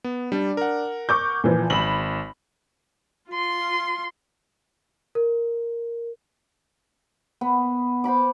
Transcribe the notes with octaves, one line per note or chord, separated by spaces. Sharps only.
B3
G3 D4
A#4 F#5
C#6 D6 G6
A#2 E3 F3
G#1 B5 F#7
F4 C6
A#4
B3
C5 F#5 B5 D6